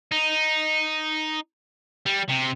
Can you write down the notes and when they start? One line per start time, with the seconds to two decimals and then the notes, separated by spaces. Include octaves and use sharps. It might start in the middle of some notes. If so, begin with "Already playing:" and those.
0.11 D#4
2.06 G3
2.30 C3